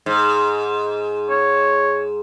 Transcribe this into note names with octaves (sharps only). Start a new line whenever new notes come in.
G#2
C#5